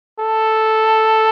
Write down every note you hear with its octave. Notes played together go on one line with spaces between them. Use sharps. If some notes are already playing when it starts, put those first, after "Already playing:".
A4